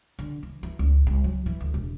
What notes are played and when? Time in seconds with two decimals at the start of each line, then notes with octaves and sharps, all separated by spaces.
0.19 D3
0.43 E3
0.63 E3
0.79 C#2
1.07 C2
1.24 F#3
1.46 E3
1.61 D2
1.74 E1